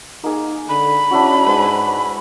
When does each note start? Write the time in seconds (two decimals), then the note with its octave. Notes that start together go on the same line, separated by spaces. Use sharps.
0.24 A#3 D#4 G#4
0.69 D3 B5
1.11 C#4 D4 E4 F#4
1.46 G#2 B4 C5 G#5